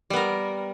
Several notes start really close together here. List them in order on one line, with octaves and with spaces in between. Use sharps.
G3 B3 A#4